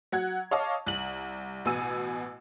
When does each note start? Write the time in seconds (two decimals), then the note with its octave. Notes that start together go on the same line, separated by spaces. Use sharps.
0.12 F#3 F#5 G#6
0.51 C#5 D#5 F5 A5 D6
0.86 C2 F#7
1.65 A1 B2 G#5 E6 D#7